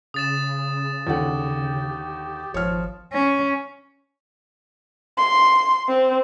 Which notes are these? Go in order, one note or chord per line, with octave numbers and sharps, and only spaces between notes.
C#3 D#6 A6 E7
D#2 D3 G4 F#5
G#1 F3 C#5 F6
C#4
C6
C4